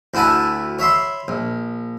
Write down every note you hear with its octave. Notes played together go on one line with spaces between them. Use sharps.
D2 E4 F#4 G#5 A5
C#5 E5 B5 C6
A#1